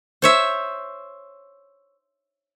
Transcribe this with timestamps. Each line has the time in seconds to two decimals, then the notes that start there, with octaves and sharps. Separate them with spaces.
0.22 C5 C#5 E5